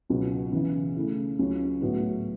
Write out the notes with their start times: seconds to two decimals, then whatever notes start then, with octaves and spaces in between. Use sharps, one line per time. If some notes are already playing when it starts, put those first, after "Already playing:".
0.09 C#2 B2 F#3 B3 F#4
0.52 C#3 E3 B3
0.96 C#3 A3 E4
1.39 C#2 C#3 F#3 C#4
1.82 A2 F#3 B3 F#4